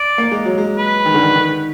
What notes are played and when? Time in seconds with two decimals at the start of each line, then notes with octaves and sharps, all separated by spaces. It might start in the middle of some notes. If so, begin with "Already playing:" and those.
Already playing: D5
0.18 A#3
0.31 G#3
0.45 F#3
0.58 G#3
0.76 B4
1.06 D#3
1.14 D3
1.23 D#3
1.35 D#3